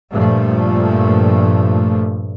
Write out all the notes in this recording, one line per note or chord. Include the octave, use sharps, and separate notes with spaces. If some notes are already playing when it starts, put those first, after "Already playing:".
G2 A#2 F3 A3